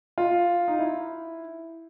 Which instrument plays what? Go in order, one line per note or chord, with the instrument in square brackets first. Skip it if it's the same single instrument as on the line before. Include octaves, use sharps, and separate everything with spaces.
[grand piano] F4
D#4
E4